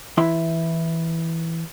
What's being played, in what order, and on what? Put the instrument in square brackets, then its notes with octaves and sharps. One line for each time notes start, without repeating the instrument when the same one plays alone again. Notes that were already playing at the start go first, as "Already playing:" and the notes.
[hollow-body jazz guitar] E3 E4 E5 C6